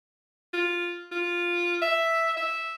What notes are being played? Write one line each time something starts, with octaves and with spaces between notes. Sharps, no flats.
F4
F4
E5
E5